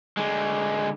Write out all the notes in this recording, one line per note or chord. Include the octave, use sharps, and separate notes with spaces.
D3 G#3